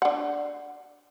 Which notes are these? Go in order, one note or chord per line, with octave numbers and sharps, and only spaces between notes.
D4 F#5